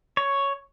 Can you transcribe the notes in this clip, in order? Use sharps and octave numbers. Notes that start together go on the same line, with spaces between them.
C#5